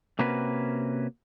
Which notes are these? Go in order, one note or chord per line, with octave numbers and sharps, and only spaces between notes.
C3 A#3 C#4 F#4 B4